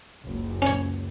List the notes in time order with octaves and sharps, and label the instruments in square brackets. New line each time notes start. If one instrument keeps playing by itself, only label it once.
[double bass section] F#1 C#2
[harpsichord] C#4 C#5